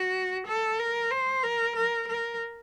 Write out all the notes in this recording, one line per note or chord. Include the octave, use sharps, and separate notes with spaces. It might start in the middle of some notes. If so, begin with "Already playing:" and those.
Already playing: F#4
A4
A#4
C5
A#4
A#4
A#4